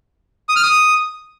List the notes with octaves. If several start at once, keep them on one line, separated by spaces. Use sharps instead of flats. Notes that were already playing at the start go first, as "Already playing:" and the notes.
D#6
F6
D#6